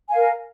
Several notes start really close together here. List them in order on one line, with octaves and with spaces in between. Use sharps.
G#5 F5 A#4